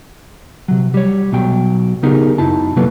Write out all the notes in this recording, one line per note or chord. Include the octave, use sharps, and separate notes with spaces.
C3 F#3
G3 C#5
B1 B2 F#3 G5
C#3 B3 D#4 G4 G#4 A#4
F#2 D#4 E4 A5
C3 F#3 A#3 B3 A4 B4